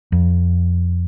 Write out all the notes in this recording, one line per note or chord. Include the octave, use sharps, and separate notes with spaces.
F2